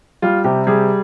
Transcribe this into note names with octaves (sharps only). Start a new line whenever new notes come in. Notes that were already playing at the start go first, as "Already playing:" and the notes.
G3 F4
C3 G4
G3 G#4